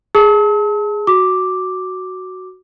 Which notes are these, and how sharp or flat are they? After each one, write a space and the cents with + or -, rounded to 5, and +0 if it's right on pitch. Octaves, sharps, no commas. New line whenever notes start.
G#4 +0 A5 +0 E6 -45
F#4 +0 D6 +0